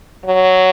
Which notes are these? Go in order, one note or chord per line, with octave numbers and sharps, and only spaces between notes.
F#3